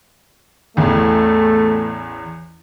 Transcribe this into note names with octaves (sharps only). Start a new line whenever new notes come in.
A1 E2 A3